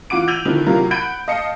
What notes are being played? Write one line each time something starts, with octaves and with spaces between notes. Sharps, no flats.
E3 F4 F#5 D6 D7
E6 G6 D#7 F7 F#7
D3 D#3 F3 E4
C3 F#3 E4 F4 A#4
F#5 B5 G6 D7
D#5 F5 A5 C#7